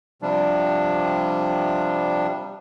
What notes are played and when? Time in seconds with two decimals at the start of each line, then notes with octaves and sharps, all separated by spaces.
0.22 C3 F3 G3 D4